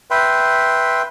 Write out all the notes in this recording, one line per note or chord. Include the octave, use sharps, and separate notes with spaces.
B4 E5 G5 C6